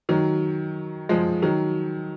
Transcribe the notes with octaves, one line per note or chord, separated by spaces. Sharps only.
D#3 F#3
F3 G#3
D#3 F#3